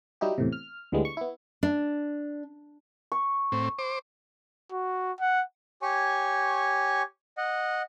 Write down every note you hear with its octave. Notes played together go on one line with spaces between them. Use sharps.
F#3 G3 D#4 E4 G4
E2 A2 C3
F6
D2 D3 E3 G3 G#3 B3
C#6
B3 E4
D4
C#6
A2 C4
C5 D6
F#4
F#5
G4 C#5 G#5 C#6
D#5 F#5